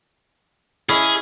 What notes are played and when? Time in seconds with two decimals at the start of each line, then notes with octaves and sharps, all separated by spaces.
0.89 C#4 E4 G#4 D#5